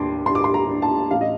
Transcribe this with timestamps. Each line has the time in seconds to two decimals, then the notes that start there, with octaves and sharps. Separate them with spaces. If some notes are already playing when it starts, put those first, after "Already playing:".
Already playing: D#2 D4 C6 D6
0.26 D4 C6
0.35 D6
0.44 C6
0.54 A#5
0.69 D4
0.82 A5
1.11 A1 F5
1.21 D#5